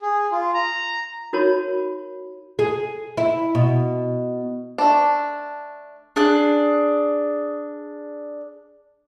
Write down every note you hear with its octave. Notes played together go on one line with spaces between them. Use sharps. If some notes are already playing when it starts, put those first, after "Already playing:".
G#4
F4
A#5
D#4 F#4 A#4 C#5 A5 B5
G#4
E4
B2
A3 D4
D4 G#4 F#6